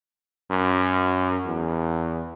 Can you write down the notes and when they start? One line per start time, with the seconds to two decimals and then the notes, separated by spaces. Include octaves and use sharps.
0.50 F#2
1.47 E2